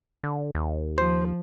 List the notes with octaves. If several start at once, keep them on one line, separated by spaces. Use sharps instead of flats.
D3
D#2
F3 C5